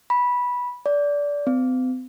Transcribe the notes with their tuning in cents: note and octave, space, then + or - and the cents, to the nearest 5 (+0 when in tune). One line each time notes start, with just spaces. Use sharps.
B5 -10
D5 -20
C4 -45